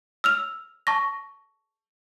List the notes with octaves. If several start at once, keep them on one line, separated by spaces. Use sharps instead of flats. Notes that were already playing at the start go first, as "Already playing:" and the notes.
E6 F6 F7
A5 C#6 A#6